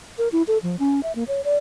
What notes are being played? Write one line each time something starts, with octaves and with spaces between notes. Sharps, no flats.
A#4
E4
A4
F3
C#4
E5
A#3
C#5
D5